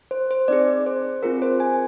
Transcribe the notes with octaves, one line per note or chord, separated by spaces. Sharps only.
C5
C5
C4 D#4 G#4 D5
C5
C4 F4 G#4 A#4
C5
G#5